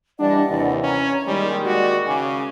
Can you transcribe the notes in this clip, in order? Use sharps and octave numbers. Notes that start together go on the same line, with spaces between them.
E3 G3 D4 D5 D#5 F#5
D#2 C3 E3
C#4 C#5 A#5
A#2 D#3 G3 G#3 C#5 G#5
F#4 D5 C#6 D6
C#3 G#5 D6